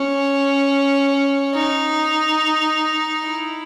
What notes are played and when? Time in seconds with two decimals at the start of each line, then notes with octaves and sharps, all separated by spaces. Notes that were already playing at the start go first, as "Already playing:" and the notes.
Already playing: C#4
1.55 D#4
3.27 E4